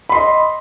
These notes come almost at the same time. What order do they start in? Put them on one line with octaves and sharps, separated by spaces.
B5 C6 D#5